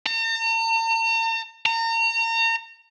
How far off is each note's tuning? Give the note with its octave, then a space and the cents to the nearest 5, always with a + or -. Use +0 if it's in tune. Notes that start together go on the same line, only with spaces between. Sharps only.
A#5 -45
A#5 -35